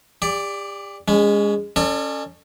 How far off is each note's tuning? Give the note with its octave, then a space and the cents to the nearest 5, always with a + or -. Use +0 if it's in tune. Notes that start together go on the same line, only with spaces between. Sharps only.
G4 +35 D5 +0
G#3 -20 C#4 +25
C#4 +0 A4 +25 D5 +45